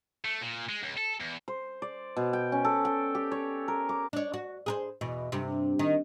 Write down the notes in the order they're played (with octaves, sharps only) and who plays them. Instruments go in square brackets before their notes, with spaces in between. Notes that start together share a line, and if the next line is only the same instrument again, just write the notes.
[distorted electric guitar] A3
A#2
G#3
C#2
A4
E2
[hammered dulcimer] C5
D5
B2
G5
C#4
A4
G5
G4
C#5
A#4
D6
[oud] D4 C#5
F#4
G#4 A#4 C5
E2 B2
G2 C3
D#3